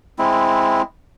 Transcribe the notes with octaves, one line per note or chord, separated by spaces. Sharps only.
G#3 C4 E4